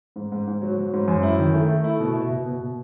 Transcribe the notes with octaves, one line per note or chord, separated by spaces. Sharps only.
G#2
G#2
G#2
F#3
F#3
G#2
F#2
E4
D#3
A3
A3
E4
B2
B2
B2
B2
B2